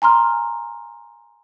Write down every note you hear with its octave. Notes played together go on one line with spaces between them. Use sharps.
G#5 A#5 C6 F6